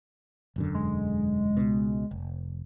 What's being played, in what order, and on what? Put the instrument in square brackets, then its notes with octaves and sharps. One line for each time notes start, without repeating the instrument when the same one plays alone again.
[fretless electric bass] E1 F#2 D3
[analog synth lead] G#3
[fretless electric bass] C#2 B2
F1